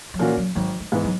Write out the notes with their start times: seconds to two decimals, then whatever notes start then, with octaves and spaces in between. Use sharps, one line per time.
0.14 F#3
0.19 A#2 E3 A#3 C#4 F#4
0.37 F#3
0.55 G#1 F#3
0.80 G#3
0.92 G#2 E3 B3
1.05 F#3